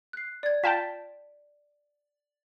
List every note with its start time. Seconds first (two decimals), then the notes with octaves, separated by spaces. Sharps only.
0.13 F#6 C7
0.43 D5 G#6
0.64 F4 G5 A5 B6 E7